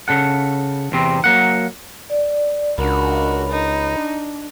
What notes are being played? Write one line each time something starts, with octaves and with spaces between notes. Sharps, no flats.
C#3 A4 F#5
E2 C3 C4
F#3 A#3 F#5
D5
C#2 D4 F#4 A#4 B5
D#4
D4